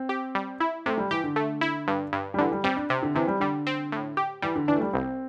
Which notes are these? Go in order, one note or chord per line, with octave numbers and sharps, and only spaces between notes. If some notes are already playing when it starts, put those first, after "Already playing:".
Already playing: C4
G4
G3
E4
C3 A3
G3
E3 G4
D3
A3
E4
G2
G2
G3
D3 E3
G3
G3 C4
D4
C3
D3
C3 E3
G3
D3 G3
C4
A2
G4
E3 G3
D3
E3 D4
A3
G3
C2 C4